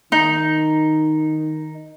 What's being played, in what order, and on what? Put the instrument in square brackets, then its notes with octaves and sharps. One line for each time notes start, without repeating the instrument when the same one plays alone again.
[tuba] D#3 [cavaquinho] D#4